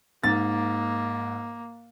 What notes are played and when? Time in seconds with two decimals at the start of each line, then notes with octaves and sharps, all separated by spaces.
0.24 G#2 A#3 A6